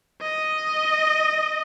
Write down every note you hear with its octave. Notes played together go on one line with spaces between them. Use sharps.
D#5